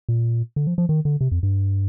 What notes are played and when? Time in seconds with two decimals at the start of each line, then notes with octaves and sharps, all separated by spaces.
0.09 A#2
0.56 D3
0.67 F3
0.78 F3
0.89 D#3
1.05 D3
1.21 C3
1.32 F2
1.43 G2